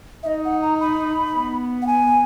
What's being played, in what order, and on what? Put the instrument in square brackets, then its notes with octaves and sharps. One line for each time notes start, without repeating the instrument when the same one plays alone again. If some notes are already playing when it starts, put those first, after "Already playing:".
[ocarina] E5
[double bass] D#4 [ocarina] D#5
[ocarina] F#5
A#5
B5
[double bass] B3
[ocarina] F#5
G#5